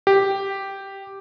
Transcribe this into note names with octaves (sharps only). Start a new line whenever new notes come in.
G4